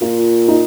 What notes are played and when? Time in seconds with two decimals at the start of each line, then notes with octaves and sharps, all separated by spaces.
0.01 A#2 F4
0.48 D#4